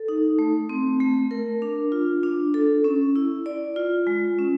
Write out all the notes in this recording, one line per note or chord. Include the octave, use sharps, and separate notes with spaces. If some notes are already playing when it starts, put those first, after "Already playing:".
Already playing: A4
D#4
A3
C4
A3
A#4
D4
F4
D4
A4
C#4
E4
D5
F4
G#3
C#4